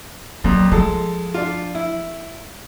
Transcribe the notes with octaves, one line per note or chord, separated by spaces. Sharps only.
F2 A#2 F#3
F3 G#3 A4
D4 F4
E4